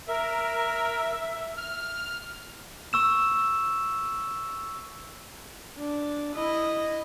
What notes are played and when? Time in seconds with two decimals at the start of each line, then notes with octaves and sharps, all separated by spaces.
0.08 A#4 E5
1.57 F6
2.93 C#6 E6 E7
5.77 D4
6.36 E4 D#5